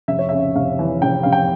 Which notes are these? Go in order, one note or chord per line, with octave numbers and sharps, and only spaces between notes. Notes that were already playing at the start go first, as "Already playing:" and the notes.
F1 E5
C#5
C#3 E5
F1 F5
E3
F1 G5
F1 F5
G5